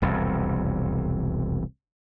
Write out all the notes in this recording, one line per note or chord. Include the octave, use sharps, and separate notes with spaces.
E1 C2 F2